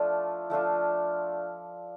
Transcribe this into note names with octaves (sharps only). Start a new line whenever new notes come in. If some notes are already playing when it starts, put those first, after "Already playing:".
Already playing: F3 A3 D4 F4
F3 A3 D4 F4